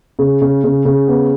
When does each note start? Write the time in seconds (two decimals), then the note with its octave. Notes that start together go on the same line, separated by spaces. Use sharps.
0.19 C#3
0.42 C#3
0.64 C#3
0.85 C#3
1.08 B3